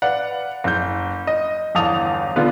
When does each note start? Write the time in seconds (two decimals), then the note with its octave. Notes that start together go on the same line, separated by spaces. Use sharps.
0.02 B4 D5 F5 F#5
0.64 F#1 G6
1.27 D#5
1.75 G1 E2 F5 A5 D#6 F7
2.36 D3 B3 D4 F4 B4